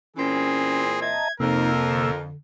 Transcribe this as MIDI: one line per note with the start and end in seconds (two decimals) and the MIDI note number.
0.17 1.21 46
0.17 1.21 52
0.17 1.21 60
0.17 0.82 61
0.17 1.01 68
1.02 1.28 75
1.02 1.31 76
1.02 1.28 81
1.02 1.28 82
1.02 1.33 92
1.40 2.30 41
1.40 2.11 48
1.40 2.11 58
1.40 1.71 63
1.40 2.22 70
1.40 2.11 88
1.89 2.36 50